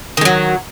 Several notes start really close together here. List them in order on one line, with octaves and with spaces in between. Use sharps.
D#3 G#3 F#3